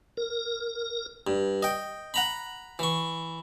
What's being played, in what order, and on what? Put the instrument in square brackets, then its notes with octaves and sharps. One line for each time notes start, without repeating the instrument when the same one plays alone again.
[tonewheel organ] A#4
[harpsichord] G2
D#5 G5
F#5 A#5 B5
E3 C#6